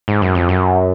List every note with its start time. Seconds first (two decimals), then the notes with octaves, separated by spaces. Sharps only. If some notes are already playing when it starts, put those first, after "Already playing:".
0.08 G#2
0.22 F#2
0.35 F2
0.49 F#2